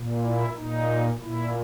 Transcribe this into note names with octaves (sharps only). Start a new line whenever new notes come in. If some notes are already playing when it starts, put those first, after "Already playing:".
Already playing: A#2
E4
A#2 D#4
A#2 E4